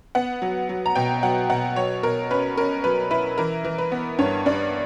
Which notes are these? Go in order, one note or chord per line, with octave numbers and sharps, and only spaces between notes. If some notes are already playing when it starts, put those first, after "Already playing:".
B3 F#5
F#3
F#3
A#5
B2 G5
F#3 F#5
B2 F#5
F#3 C#5
B2 A#4
C#4 B4
C#4 A#4
F#3 B4
E4 B4
E3 A#4
E3
B4
B3
G2 C#5
G2 D5